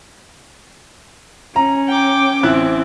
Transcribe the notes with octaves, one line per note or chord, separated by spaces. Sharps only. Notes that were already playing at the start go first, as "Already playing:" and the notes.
C#4 A#5
G5 D6
A1 C4 E4 F#6